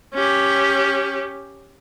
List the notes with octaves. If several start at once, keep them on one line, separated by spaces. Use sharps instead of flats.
C#4 G4